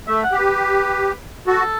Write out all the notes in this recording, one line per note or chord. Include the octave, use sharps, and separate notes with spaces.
A3 E5
F#5
G4
B4
F#4 A4